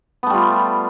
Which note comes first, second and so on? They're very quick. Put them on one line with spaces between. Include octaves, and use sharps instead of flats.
B3 A3 G3 F4